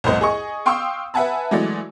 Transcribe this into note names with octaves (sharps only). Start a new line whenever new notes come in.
C2 F2 A2 C5 D#5
G#4 D#5 C#6
F5 G5 C6 C#6 D#6 E6
B4 E5 F#5 G#5 A5 B5
E3 F#3 G#3 A3 D5